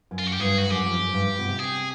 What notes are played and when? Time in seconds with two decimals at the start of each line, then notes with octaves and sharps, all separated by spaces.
0.11 F#2
0.19 F4
0.27 F#4
0.33 G4
0.40 G2 G#4
0.58 F#4
0.69 F#2 G4
0.85 F2
0.99 F#2
1.14 G2
1.39 B2
1.49 C3
1.59 G#4